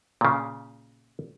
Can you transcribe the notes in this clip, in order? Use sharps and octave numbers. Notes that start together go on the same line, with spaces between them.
A#2 C#3